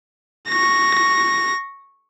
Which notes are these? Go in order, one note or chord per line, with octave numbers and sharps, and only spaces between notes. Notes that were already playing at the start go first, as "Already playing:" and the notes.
C#6 A#6